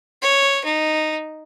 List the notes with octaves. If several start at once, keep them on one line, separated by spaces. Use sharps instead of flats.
C#5
D#4